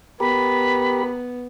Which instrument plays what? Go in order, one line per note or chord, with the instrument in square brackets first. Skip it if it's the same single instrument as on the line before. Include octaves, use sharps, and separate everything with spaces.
[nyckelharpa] B3 [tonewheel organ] G4 A#4 [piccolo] B5